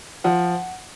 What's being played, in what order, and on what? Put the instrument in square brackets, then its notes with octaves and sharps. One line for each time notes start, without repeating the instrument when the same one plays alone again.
[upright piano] F3 F#5